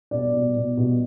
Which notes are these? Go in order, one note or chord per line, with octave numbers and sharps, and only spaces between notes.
B2 D5
B2
B2
B2